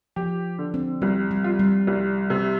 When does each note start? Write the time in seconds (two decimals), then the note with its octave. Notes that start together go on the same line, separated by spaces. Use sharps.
0.16 F3 G4
0.58 D3
0.74 C4
1.02 C2 G3
1.31 G3
1.44 F4
1.59 G3
1.87 C2
2.30 C3